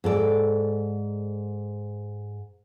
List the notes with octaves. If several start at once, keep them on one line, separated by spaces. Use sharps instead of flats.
G#2 A4 D5